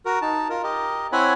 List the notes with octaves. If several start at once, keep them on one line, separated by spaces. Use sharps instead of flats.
F#4 A#4
D#4 A5
F4 A#4
G4 A#4 D#5
C4 E4 C#5 F#5 G#5 B5